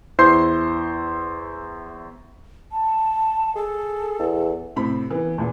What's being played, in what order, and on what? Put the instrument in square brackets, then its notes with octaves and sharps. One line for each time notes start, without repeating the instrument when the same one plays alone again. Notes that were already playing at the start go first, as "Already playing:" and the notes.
[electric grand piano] E2 E4 C5 C6 G6 C7
[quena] A5
[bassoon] G#4 [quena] A4
[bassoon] E2
[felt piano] A2 C3 C4 B5
E3 B3
E2 A#2